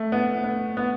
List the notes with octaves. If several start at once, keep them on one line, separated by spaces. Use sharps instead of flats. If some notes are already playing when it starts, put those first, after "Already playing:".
Already playing: A3
B3
B3
B3